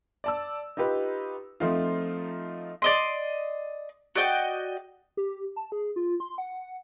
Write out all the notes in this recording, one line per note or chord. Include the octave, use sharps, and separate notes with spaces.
D5 A5 E6
D#4 F4 G4 B4
F3 A3 C4 D#4 F4
D5 D#5 C6
F#4 D5 D#5 G5
G4
A5
G#4
F4
C6
F#5